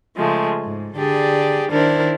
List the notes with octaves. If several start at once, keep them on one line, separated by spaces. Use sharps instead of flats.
C#3 F3 G#3 A3
G#2
D3 G4 G#4 D5
D#3 D4 E4 A#4 C5 D5